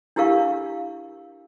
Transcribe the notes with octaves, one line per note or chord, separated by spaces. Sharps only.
D4 E4 G4 A#4 F5 C#6